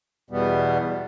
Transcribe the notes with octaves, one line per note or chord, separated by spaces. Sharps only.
E2 B2 G3 B3